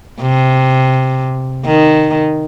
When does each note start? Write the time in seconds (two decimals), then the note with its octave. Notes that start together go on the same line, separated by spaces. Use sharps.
0.21 C3
1.65 D#3